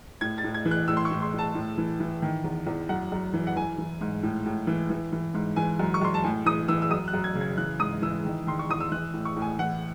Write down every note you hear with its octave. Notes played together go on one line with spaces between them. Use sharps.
A2 G#6
A6
A2
G#6
E3
F#6
A2 E6
C6
C#6
A2
C6
A2
A5
A2
E3
E3
D#3
E2
E2
F#2 F#5
F#2
E3
F#5
E3 G#5
E3
G#2
A2
A2
E3
E3
E3
G#2
E3 G#5
F#2
C#6
F#2 C6
A5
A2 G#5
E3 D#6
E3 E6
E6
F#2 D#6
F#6
F#2
G#6
C#3
G#6
E3 F#6
G#2 D#6
E3 E6
D#3
D#3 C6
C#6
E2 D#6
E6
E3 F#6
A2
C#6
A2
G#5
E3 F#5